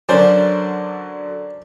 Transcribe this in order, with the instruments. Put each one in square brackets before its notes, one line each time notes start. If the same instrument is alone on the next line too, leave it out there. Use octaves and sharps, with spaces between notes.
[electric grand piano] D3 F#3 [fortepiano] C#4 C5 D5 [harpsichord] D4 A#4